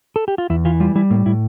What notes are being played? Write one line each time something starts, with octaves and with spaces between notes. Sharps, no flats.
A4
G4
F4
E2 E4
E3 F4
G3 F4
G3 E4
A2 A#3
A2 E4